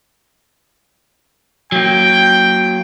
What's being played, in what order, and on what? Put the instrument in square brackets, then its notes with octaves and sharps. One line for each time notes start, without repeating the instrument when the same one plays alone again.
[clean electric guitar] F#3 A#3 [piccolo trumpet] G5